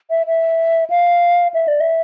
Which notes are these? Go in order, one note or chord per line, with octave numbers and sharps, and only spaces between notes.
E5
E5
F5
E5
D5
E5